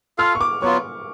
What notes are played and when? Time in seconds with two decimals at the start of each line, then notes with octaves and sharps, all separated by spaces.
0.18 F4 A4 F5 F6
0.35 C#6
0.41 D6
0.62 F#3 B3 F4 C#6